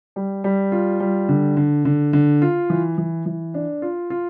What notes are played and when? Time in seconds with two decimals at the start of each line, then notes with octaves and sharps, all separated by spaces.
0.16 G3
0.44 G3
0.72 F4
1.00 G3
1.29 D3
1.57 D3
1.85 D3
2.13 D3
2.42 F4
2.70 E3
2.98 E3
3.26 E3
3.54 D4
3.82 F4
4.10 F4